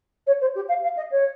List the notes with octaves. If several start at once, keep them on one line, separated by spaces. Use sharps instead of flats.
C#5
C5
G4
F5
F5
D#5
C#5